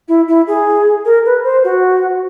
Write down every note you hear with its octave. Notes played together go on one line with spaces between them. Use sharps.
E4
E4
G#4
A#4
B4
C5
F#4